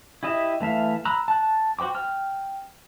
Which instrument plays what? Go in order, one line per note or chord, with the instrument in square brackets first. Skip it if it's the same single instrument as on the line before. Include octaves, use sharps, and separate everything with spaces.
[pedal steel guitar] E4 G4 D#5 E5
E3 A3 E5 F5
A#5 B5 E6 F#6
A5 F#6
F#4 C5 G5 D6
G5 F6